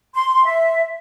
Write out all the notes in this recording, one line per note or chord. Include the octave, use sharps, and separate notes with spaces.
C6
E5